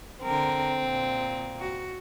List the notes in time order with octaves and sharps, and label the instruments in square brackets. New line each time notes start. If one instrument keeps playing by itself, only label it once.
[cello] D3 A#4 [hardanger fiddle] C4
[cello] A#2
F#4